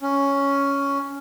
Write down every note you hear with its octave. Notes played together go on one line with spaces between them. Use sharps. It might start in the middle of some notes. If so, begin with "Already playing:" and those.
C#4